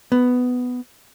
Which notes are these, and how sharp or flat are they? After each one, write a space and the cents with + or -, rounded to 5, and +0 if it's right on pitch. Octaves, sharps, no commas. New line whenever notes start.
B3 +10